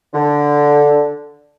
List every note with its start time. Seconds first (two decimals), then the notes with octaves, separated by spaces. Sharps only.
0.14 D3